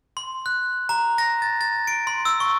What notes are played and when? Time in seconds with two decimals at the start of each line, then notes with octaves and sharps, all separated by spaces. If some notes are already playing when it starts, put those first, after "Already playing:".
0.17 C6
0.46 F#6
0.89 A#5
1.18 A#6
1.42 A6
1.61 A6
1.87 D7
2.07 C6
2.25 E6
2.40 C#6